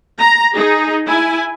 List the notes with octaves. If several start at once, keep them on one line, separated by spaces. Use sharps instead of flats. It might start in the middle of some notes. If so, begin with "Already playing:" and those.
A#5
D#4 G#4
E4 G#5